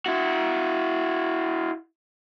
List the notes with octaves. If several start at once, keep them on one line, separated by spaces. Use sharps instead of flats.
E4 F#4